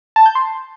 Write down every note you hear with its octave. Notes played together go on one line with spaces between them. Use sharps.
A5
G6
C6